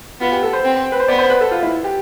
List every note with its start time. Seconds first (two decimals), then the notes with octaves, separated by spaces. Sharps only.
0.20 B3 F4
0.32 G4
0.43 A4
0.53 C5
0.64 C4
0.92 B4
1.00 C5
1.08 B3 D5
1.19 C5
1.30 B4
1.41 A4
1.51 F4
1.63 E4
1.84 G4